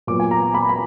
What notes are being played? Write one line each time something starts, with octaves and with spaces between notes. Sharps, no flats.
A#2 F#3 B3 D6
G#5
A#5
B5
B5